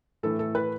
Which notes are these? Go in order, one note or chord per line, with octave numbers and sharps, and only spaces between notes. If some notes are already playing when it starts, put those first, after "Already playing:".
A2 E3 A3 A4
A4
B4